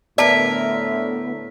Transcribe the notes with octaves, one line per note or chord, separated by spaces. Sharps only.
A2 D3 B3 A#4 D5 E5 A5